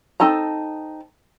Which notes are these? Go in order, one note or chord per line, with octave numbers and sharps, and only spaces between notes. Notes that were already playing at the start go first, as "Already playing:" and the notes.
C4 D#4 A4 A5 A#5